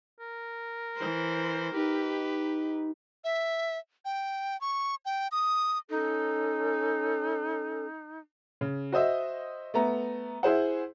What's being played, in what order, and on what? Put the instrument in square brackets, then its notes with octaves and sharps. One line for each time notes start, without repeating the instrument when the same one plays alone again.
[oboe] A#4
[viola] E3 C5
[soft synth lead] D#4 [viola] G4 B4
[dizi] E5
G5
C#6
G5
D#6
[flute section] C#4 A4 [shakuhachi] D#4
[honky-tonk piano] C#3
F#4 C5 D#5 E5
A3 B3 A#5
E4 G#4 C5 F#5